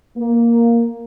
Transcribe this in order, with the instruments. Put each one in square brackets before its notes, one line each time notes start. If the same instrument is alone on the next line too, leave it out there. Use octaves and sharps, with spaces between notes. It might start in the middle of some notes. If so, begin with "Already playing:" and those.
[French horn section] A#3